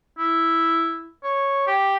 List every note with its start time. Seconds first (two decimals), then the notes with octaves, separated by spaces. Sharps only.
0.18 E4
1.23 C#5
1.67 G4